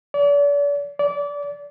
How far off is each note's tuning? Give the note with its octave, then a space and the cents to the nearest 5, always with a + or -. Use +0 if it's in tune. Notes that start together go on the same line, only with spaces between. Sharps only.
D5 -40
D5 -25